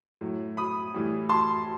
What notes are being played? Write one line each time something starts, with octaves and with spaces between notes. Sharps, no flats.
A2 F#3
B5 D#6
A2 E3 G3
A5 C6